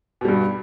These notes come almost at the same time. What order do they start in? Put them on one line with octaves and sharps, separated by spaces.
B2 G3 G2